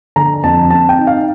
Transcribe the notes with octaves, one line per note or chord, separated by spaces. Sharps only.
D3 A#5
F2 A5
C4 A5
G5
D#4
F5